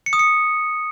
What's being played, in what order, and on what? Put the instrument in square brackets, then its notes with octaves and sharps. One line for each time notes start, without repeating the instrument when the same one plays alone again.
[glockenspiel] C#7
D#6
C#7